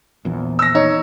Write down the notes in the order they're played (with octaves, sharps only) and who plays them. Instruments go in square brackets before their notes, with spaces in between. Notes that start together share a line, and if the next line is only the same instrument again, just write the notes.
[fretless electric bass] A#1 E2
[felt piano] E6 A#6
[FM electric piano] D#4 [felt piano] C#5